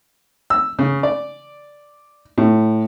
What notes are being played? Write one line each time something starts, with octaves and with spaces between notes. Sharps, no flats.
E6
C#3
D5
A2